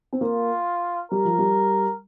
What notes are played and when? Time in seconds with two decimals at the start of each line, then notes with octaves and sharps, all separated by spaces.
0.13 C4
0.21 A#3 F4
1.11 G3 A#4
1.25 F3
1.39 G3